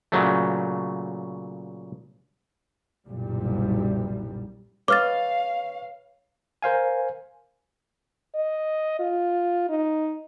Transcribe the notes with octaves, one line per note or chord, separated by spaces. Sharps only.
A#2 C#3 F#3 A3
F#1 B1 A#2 G3
B4 C#5 D#5 F5 D6 F6 A6
A#4 C5 F5 G#5
D#5
F4
D#4